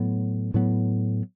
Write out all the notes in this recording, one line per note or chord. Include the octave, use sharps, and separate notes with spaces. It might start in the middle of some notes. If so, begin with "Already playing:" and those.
Already playing: A2 F#3 B3
A2 F#3 B3